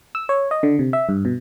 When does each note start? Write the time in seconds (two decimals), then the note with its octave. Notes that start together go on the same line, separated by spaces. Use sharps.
0.15 E6
0.29 C#5
0.51 D#5
0.63 D3
0.79 C3
0.93 E5
1.09 G2
1.25 B2